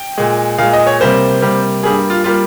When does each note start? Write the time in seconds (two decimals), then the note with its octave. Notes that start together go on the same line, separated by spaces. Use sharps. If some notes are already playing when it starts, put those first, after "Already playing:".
Already playing: G5
0.18 A#2 G#3
0.58 A#2 G#3 F5
0.73 D#5
0.87 C#5
1.00 C3 G3 A#3 C5
1.41 C3 G3 A#3
1.83 G2 G3 A#3 G#4
2.10 F4
2.24 G3 A#3 F4